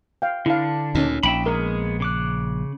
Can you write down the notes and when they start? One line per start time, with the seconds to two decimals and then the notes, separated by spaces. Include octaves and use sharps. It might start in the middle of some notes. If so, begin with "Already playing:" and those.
0.22 F5 G5
0.46 D3 D4 E4 F5
0.95 D2 A#2 C#4 D#4
1.23 A#1 E5 G5 B5
1.46 G#3 B3 G#4 A#4
2.00 C#3 D6 F#6